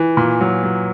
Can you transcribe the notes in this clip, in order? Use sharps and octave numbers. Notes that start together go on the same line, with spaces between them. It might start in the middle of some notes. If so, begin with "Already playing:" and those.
Already playing: E3
A#2
F#3
F#3